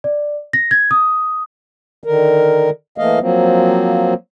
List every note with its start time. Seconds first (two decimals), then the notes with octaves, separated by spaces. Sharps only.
0.04 D5
0.53 A#6
0.71 G#6
0.91 D#6
2.04 D3 D#3 A#4
2.98 E3 A3 A#3 D#5 F5
3.20 F3 F#3 A#3 C4